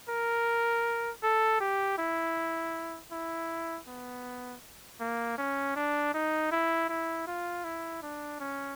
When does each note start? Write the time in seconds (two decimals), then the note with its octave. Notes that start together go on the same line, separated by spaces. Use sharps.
0.09 A#4
1.23 A4
1.61 G4
1.98 E4
3.12 E4
3.87 B3
5.00 A#3
5.38 C#4
5.76 D4
6.14 D#4
6.52 E4
6.89 E4
7.27 F4
7.64 E4
8.02 D4
8.40 C#4